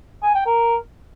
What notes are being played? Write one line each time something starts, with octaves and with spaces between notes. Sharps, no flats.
G#5
G5
A#4